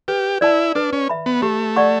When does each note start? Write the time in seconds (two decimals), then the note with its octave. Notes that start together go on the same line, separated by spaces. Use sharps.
0.08 G4 B4
0.41 E4 D5 A5
0.75 D4 B4
0.93 C#4
1.09 E5 B5
1.26 B3
1.42 A3 G4
1.76 D5 F#5 C#6